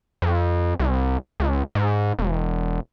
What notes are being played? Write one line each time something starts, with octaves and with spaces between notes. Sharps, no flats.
F2
C2
C#2
G#2
E1